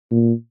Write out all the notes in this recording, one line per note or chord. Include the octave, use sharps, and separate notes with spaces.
A#2